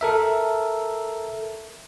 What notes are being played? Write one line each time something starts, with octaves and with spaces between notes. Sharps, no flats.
A4 A#4 E5